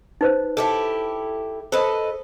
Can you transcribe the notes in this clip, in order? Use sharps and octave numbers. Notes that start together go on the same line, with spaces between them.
D#4 B4 C5
E4 G4 A4
A4 B4 C5 D#5